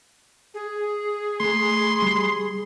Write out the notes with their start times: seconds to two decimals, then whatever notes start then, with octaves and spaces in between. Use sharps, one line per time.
0.54 G#4
1.40 A3 C6
2.02 G3